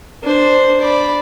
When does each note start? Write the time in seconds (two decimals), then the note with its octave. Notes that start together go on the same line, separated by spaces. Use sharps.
0.23 D4 C5
0.81 D5 B5